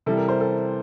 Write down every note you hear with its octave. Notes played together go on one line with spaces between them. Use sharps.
C3 E3 G3 A4
A#4
C5
A4